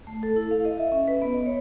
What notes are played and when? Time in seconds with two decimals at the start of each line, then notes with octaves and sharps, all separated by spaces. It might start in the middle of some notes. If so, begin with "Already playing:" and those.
0.07 A3
0.23 A4
0.36 E4
0.51 F5
0.65 D#5
0.78 E5
0.92 C#4
1.08 B4
1.22 B3
1.34 D#5
1.46 C#5